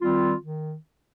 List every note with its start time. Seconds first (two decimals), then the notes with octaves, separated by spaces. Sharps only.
0.02 D#3 G3 C4 F4
0.42 D#3